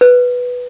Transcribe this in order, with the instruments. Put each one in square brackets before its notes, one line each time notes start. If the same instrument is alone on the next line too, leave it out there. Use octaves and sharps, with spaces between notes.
[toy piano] B4